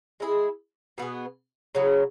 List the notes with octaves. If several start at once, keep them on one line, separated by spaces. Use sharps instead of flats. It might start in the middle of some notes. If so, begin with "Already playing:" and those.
G#3 E4 G#4
B2 B3 G#4
C#3 F#3 E4 G#4